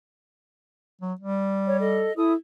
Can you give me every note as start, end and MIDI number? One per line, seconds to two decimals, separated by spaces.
1.01 1.13 54
1.21 2.07 55
1.67 1.79 73
1.79 2.12 69
1.79 2.12 75
2.17 2.33 64
2.17 2.33 69
2.17 2.33 87